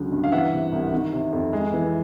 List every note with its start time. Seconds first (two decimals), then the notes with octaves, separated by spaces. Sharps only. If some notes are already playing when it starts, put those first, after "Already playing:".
Already playing: C#2 D3 F#3
0.12 G2
0.24 F5
0.31 E3 E5 F#5
0.51 C3
0.72 C2
0.92 D#3
1.13 C3
1.33 F2
1.53 G#3
1.73 E3